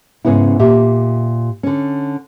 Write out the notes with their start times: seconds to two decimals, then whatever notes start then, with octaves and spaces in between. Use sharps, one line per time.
0.25 G#2 C#3 B3 C#4 E4
0.59 A#2 G4 E5
1.63 D3 C#4